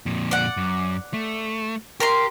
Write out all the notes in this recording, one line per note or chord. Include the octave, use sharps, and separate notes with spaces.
F2 A#2
D5 F#5
F#2
A3
G4 A#4 A#5 C6